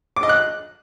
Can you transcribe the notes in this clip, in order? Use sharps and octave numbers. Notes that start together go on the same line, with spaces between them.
D6
D#5
F#6